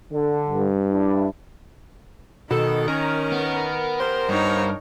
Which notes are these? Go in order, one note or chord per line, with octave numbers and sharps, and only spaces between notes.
D3
G2
D4 E4
B2 D#3 A4
C#4 A#4
B3
B3 G4 C5 C6
G2 D#4 C#5